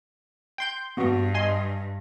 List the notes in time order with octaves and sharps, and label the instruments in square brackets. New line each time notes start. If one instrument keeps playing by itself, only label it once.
[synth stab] G5 C6 G6
[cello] G2 [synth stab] B3 F#4
[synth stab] D#5 G#5 C6